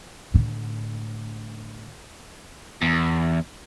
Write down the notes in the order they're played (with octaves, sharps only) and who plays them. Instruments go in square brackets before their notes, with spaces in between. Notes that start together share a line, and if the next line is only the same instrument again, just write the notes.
[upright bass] A2 D3
[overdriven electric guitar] E2